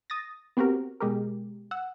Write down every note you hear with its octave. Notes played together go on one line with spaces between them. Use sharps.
D#6 A6 A#6
B3 C4 F#4 G4 A#4
B2 G#3 G4 A#4
F#5 E6